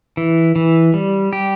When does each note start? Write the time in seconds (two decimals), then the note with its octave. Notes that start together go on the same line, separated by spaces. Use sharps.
0.17 E3
0.56 E3
0.94 G3
1.33 G4